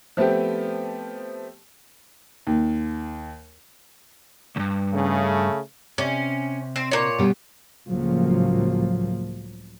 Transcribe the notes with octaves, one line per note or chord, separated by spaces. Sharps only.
F3 A3 B3 C4 G4
D#2
C#2 G2
C#3 A3
C3 C#4
C4
A#2 C#5
B2 G3 B3
C#2 A2 F3 F#3 A#3